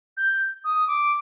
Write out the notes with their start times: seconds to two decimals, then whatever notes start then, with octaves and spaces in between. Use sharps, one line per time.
0.17 G6
0.64 D#6
0.87 D6